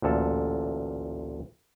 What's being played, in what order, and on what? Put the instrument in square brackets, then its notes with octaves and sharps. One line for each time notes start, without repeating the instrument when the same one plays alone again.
[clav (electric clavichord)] A1 D2 A#2 A4